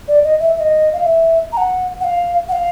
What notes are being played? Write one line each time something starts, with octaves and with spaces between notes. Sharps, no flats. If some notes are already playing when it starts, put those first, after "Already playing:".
D5
D#5
E5
E5
D#5
F5
E5
A#5
F#5
F#5
F5
F#5
F5